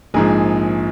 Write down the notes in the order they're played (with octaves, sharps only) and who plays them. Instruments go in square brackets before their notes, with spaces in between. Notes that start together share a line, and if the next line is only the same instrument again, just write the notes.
[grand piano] A#1 G#2 F3 G#4